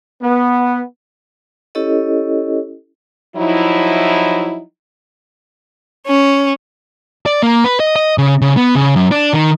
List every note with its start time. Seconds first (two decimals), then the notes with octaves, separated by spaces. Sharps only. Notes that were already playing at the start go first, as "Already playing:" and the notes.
0.22 B3
1.75 C#4 E4 G4 A4 C#5 D#5
3.36 F3 F#3 D#4 E4
6.06 C#4
7.26 D5
7.43 A#3
7.64 B4
7.80 D#5
7.96 D#5
8.18 C#3
8.42 C#3
8.57 B3
8.75 C#3
8.96 F#2
9.11 D4
9.34 D#3